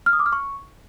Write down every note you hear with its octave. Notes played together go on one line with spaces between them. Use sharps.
F6
D#6
D6
F6
C#6